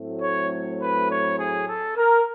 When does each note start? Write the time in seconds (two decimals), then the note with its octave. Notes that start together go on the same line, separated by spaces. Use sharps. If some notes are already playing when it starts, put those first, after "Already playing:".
Already playing: A2 F#3 A3 C4
0.21 C#5
0.80 B4
1.08 C#5
1.38 G#4
1.67 A4
1.96 A#4